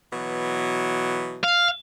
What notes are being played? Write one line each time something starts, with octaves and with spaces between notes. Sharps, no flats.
B2 E3 F#3
F5